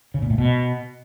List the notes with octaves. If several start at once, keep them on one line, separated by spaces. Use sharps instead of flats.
C#3
A#2
A2
B2